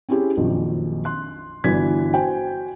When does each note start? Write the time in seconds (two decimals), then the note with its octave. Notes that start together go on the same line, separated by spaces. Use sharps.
0.09 C4 C#4 E4 G4 G#4
0.37 A#1 F2 D#3 F#3
1.05 C6 F#6
1.64 G1 E3 D4 F#4 G#6 B6
2.13 F#4 C5 G5 G#5